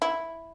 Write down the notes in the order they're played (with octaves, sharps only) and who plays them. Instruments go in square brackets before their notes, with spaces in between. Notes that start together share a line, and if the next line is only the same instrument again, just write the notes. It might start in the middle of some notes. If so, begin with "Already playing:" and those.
[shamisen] E4